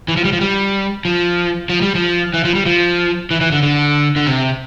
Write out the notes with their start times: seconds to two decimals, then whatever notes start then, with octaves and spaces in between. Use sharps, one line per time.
0.08 E3
0.17 F3
0.25 G3
0.33 F3
0.41 G3
1.05 F3
1.69 F3
1.82 G3
1.95 F3
2.34 E3
2.45 F3
2.55 G3
2.66 F3
3.31 E3
3.41 E3
3.52 D3
3.62 D3
4.16 D3
4.27 C3